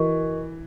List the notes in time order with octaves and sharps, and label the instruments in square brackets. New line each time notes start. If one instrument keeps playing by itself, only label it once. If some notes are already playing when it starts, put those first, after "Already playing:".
Already playing: [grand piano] E3 [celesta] F#4 A#4 D#5 C#6